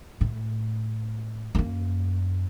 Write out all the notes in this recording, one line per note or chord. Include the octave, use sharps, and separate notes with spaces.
A2
F#2 A#3